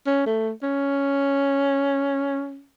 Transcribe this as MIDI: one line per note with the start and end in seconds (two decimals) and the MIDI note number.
0.06 0.25 61
0.26 0.51 57
0.63 2.66 61